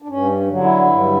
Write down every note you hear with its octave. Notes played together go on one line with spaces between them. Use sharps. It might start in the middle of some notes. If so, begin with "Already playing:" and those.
D4
G2 C#4
D3 F#3
E4
G2